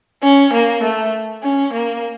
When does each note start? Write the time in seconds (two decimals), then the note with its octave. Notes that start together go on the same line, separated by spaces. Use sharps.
0.23 C#4
0.53 A#3
0.83 A3
1.43 C#4
1.73 A#3